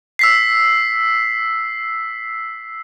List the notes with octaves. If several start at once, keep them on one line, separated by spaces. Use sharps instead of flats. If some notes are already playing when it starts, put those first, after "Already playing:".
E6 B6 C7